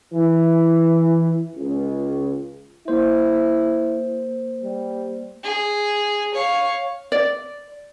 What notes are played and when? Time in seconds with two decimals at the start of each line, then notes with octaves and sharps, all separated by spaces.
0.14 E3
1.56 C#2
2.88 A#3 E4 C5
4.64 G3
5.44 G#4
6.34 C#5 F5
7.12 D5